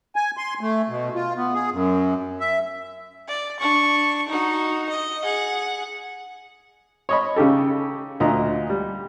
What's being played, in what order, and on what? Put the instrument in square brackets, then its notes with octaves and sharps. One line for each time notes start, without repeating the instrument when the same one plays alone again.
[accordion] G#5
C6
A3
B2
F4
B3
G#4
F#2
E5
[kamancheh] D5
D4 C#6
D#4 F#4
D#5
G#4 F#5
[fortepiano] C#5 D#5 B5
C#3 D#4 G4 A4
D2 A#2 D#5 A#5
G3